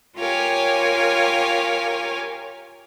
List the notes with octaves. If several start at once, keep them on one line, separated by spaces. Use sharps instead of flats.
F4 G4 A#4 C#5 F5 G#5